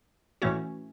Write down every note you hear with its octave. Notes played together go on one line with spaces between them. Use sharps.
A2 E3 A3 C#4 F#4